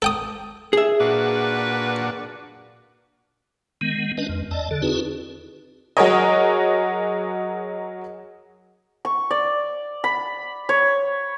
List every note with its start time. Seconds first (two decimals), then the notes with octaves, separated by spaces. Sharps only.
0.02 A4 G5 D#6
0.73 G#4 E5
1.00 A#2 D4 F#4 B4
3.81 D#3 G#3 B3
4.18 C#4 D4 B4 D#5
4.29 F2
4.51 E2 D5 D#5 A5
4.71 D3 A4
4.82 C4 D#4 E4 F#4 G#4 B4
5.97 F#3 F#4 G#4 A#4 C#5 D#5
9.05 C#6
9.31 D5
10.04 B5
10.69 C#5